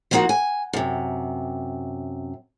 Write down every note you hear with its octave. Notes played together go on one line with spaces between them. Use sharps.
F3 G3 A#3 C4 D#4 F#4
G#5
F#2 C3